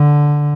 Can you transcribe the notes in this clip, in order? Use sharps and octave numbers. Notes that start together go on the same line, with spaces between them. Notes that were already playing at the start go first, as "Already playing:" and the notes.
Already playing: D3